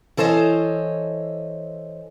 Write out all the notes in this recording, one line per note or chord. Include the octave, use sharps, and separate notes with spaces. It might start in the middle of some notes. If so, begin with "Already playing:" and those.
E3 A4 C5 C#5 D#5